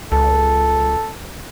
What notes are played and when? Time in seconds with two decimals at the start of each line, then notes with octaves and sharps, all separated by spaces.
0.12 C#2 A4